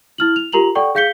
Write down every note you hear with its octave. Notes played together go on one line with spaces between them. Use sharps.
E4 F6 F#7
F7
F4 G4 A#4 A#5 F7 F#7
A4 D5 F#5 G5 C#6
G#4 F5 G6 B6 C#7 G7